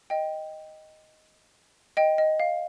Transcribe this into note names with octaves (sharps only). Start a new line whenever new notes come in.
D#5 G5
D#5 G5
D#5
F5